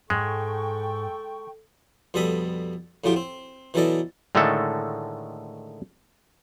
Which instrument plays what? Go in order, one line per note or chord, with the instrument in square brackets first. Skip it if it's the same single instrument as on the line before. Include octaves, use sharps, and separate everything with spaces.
[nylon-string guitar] G#2 [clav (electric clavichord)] G#3 [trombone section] A4 [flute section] G5 C#6
[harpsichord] F2 B2 G3 A4 B5 D#6
F2 A2 F#3 F4 G4 G5
C4
B2 E3 F#3 A4 D5 D#5
[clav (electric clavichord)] A2 D3 D#3 G#3 A3 A4